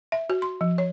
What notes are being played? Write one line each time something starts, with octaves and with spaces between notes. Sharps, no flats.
E5
F#4
C6
F3
C#5